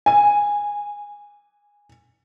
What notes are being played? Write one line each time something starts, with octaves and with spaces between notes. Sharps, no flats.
G#5 D#7